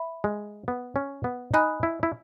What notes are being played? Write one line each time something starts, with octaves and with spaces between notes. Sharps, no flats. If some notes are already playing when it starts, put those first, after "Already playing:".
Already playing: E5 B5
G#3
B3
C#4
B3
D#4 D#5 G#5 B5 D#6 F#6
E4
E4